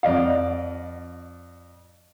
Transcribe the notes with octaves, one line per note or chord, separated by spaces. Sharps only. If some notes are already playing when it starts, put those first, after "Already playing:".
F2 D5 D#5 F5